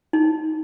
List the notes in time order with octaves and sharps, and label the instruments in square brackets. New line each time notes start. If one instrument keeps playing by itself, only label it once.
[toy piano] D#4